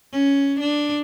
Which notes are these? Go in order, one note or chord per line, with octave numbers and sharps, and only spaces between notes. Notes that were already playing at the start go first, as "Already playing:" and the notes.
C#4
D4